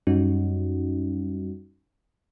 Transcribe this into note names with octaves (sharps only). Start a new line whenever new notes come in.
F#2 G3 C#4 D#4 F#4